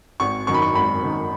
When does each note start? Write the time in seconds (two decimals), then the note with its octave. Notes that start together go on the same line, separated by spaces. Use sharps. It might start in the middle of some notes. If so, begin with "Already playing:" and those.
0.20 G#1 C#6
0.47 F#2 D#3 C#6
0.54 B5
0.62 C#6
0.75 G#1 B5
1.03 F#2 D#3